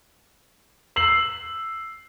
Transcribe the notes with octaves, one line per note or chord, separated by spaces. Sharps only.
E6 C7 F#7